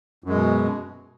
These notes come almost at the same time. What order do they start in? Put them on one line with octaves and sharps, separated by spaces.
F#2 G#3 B2